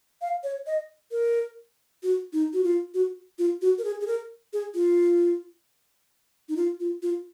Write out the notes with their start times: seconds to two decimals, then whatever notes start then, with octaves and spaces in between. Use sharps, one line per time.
0.21 F5
0.43 C#5
0.67 D#5
1.12 A#4
2.03 F#4
2.33 D#4
2.53 F#4
2.63 F4
2.94 F#4
3.39 F4
3.62 F#4
3.78 A#4
3.84 G#4
4.01 G#4
4.07 A#4
4.53 G#4
4.75 F4
6.49 D#4
6.56 F4
6.80 F4
7.03 F4